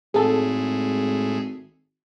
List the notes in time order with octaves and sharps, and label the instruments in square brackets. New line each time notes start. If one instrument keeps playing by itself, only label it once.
[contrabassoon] G#1 [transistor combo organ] A2 G#3 [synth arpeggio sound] G#4 A4